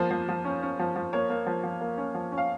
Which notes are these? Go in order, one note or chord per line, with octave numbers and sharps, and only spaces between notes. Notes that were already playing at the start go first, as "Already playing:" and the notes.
Already playing: F3 A#3 C5
F3
F3
C#4
C#4
F3
F3
A#3 C#5
A#3
F3
F3
A#3
C#4
F3
C#4
F5